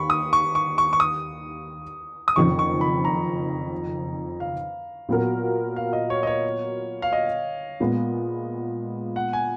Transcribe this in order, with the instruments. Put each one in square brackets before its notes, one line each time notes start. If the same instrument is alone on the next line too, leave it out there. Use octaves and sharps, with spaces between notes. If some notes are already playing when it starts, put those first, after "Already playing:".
Already playing: [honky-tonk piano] D#2 D#3 [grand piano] B5 C#6
[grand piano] D#6
C#6
C#6
C#6
C#6
D#6
D#6
[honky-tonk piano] F#1 F2 D#3 [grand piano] C#6
[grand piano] C#6
B5
A#5
F5
[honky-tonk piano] A#2 F#3 B3 F#4 A#4
[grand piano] F5
D#5
C#5
D#5
C#5
F5
D#5
[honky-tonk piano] A#2 G#3 B3
[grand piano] F#5
G#5